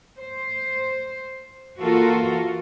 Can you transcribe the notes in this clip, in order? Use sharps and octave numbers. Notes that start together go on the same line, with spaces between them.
C5
E3 A#3 F4 F#4 A4 A#4